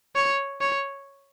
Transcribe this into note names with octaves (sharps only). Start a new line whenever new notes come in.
C#5
C#5